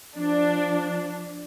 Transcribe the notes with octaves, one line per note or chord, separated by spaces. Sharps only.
F3 D4